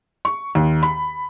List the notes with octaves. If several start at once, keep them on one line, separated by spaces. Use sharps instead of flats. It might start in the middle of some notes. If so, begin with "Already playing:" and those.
C#6
D#2
B5